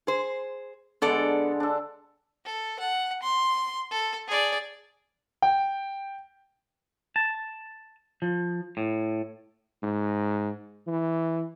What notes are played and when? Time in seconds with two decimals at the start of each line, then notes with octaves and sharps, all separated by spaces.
0.07 G#4 C5
1.02 D3 G#3 B3 A4 D5
1.60 D4 A4
2.45 A4
2.80 F#5
3.23 C6
3.91 A4
4.28 G#4 D5
5.42 G5
7.16 A5
8.22 F3
8.77 A2
9.83 G#2
10.87 E3